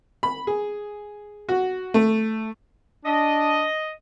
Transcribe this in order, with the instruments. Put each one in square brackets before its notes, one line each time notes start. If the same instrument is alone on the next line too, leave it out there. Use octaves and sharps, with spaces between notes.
[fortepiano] B5
G#4
F#4
A3
[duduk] D4 [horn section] D#5